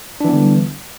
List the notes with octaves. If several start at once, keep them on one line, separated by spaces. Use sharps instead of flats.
D3 E3 G3 B3 D4